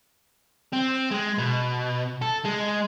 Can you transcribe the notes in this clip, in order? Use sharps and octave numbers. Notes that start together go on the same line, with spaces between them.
C4
G#3
B2
A4
G#3